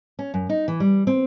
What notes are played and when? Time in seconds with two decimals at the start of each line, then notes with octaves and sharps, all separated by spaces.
0.19 C#4
0.34 F#2
0.49 D#4
0.68 E3
0.80 G3
1.07 C4